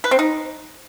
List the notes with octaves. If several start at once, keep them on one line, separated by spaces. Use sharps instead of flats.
B4
C4
D#4